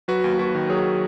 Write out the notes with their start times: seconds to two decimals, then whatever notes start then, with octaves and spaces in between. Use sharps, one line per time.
0.08 F#3 F#4 B4
0.24 D#2
0.39 D#2 F#4 B4
0.55 D#3
0.69 F#3 G#4 C#5